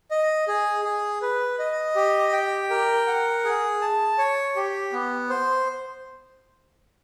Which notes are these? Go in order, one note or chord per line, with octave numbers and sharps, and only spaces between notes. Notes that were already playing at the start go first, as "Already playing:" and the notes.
D#5
G#4
G#4
B4
D#5
G4
G5
A#4
F#5
G#4
A5
C#5
G4
B3
C5